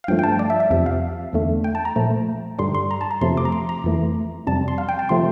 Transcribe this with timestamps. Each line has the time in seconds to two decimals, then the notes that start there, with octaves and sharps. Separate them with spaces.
0.04 F5
0.08 G2 F3 A3 G5
0.19 G5
0.23 A5
0.39 D5
0.50 E5
0.60 E5
0.70 F2 C3 F3 E5
0.86 F5
1.33 E2 D3 A3
1.64 G5
1.75 A5
1.85 A#5
1.96 A#2 F3 A3
2.59 G2 D3 G3 C6
2.75 C6
2.91 A#5
3.01 A5
3.11 A#5
3.21 F2 C3 F3 A3 C6
3.37 D6
3.45 A#5
3.52 C6
3.69 A#5
3.84 F2 E3 A3
4.47 F2 C3 G3 A5
4.68 C6
4.78 F5
4.89 G5
4.99 A5
5.09 C3 F3 A3 C6